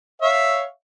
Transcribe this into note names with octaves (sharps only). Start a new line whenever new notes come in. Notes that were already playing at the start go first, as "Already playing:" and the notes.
C#5 E5 F5